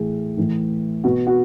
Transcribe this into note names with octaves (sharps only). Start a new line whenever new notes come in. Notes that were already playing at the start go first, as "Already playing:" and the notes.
Already playing: A2 E3 G#4
A2 E3
B2 F#4
F#4